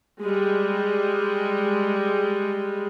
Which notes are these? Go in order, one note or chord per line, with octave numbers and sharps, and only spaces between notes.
G3 G#3